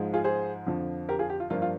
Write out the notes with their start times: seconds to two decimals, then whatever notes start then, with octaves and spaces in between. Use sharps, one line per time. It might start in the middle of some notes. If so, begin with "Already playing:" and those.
Already playing: G#2 F3 G#3
0.14 F4 G#4
0.24 G#4 C5
0.67 F2 D3 F3
1.09 G4 A#4
1.19 F4 G#4
1.30 G4
1.40 F4
1.50 G2 F3 A#3 F4
1.62 F4